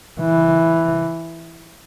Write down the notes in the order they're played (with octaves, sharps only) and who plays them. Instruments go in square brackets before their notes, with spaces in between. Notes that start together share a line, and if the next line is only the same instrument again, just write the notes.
[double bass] E3